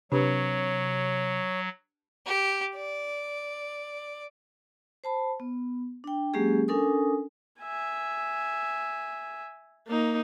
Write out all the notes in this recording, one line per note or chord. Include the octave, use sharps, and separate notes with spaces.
C3 F#3 D4 G4 B4 C#5
G4
D5
C5 A5 B5
B3
D4 G5
F#3 G#3 A#3 C#4 G4 G#4
C#4 D4 A4 A#4 G#5 D#6
E5 G#5
A#3 D#4